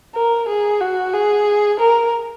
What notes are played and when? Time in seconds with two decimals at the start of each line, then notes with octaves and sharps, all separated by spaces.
0.15 A#4
0.48 G#4
0.81 F#4
1.13 G#4
1.80 A#4